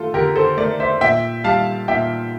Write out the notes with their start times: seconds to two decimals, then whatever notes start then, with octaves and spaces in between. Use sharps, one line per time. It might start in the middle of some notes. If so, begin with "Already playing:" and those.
Already playing: A3 F4 A4
0.14 D3 G4 A#4
0.36 A4 C5
0.57 A3 A#4 D5
0.80 C5 E5
1.01 A#2 E5 G5
1.44 G3 F5 A5
1.88 A#2 E5 G5